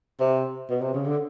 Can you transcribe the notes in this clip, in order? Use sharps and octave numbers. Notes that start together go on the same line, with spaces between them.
C3
B2
C3
C#3
D3